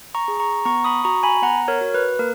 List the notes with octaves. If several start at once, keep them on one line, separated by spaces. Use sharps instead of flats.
A#5 C#6
G#4
A#5 C#6
B3 A#5 C#6
B5 D#6
F#4 A#5 C#6
G#5 B5
B3 F#5 A#5
A#4 C#5
F#4
B4
A#3 A#4